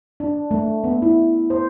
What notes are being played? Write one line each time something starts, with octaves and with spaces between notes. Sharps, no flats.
D4
A3
B3
E4
C5